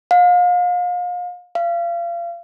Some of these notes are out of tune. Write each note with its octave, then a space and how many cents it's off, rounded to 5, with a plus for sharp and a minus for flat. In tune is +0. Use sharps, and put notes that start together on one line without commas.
F5 +35
F5 -30